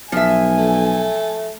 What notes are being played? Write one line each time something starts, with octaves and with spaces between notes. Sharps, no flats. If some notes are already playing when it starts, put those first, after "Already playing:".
B1 F3 E5 G#5
A3